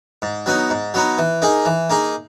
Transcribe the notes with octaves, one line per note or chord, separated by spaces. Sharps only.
G#2
F#3 B3 D#4
G#2
F#3 B3 D#4
E3
A#3 D#4 G#4
E3
A#3 D#4 G#4